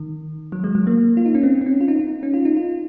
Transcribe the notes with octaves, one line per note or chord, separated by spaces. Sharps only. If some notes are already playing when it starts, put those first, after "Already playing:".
Already playing: D#3
F#3
G#3
F#3
A#3
F4
D#4
C#4
C4
C4
C#4
F4
D#4
D#4
C#4
F4
D#4
F4